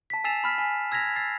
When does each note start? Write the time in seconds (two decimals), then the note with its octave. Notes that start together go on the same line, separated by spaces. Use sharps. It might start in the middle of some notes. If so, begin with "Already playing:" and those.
0.10 A5 B6
0.24 G#5 E6 A6 C7 E7 F7
0.44 B5 F6 B6
0.58 G#5
0.92 E6 G#6 A#6 B6 F7
1.16 E6 A6 C7